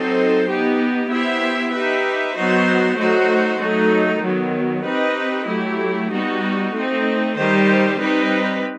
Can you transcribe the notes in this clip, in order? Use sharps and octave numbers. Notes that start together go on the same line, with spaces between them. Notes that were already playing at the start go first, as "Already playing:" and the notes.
Already playing: F#3 C4 D#4 A4 C5
B3 D#4 G4
B3 E4 G4 C5 E5
D#4 G4 B4 E5
F#3 B3 D#4 F#4 C5
F#3 A3 D#4 F#4 C5
F#3 A3 D#4 A4
D#3 F#3 B3
C4 D#4 G4 B4 D#5
F#3 A3 E4 G4
G3 B3 D#4 F#4
A3 C4 D#4
D#3 G3 D#4 G4 C5
G3 C4 D#4 G4 B4